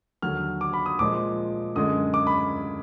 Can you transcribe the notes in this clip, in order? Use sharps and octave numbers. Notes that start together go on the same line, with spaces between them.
D#2 D3 F#3 F6
D6
B5
D#6
A#2 F3 G#3 D6
F#2 D3 G#3 D#6
D6
B5